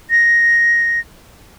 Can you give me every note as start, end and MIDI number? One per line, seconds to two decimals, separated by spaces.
0.10 1.00 94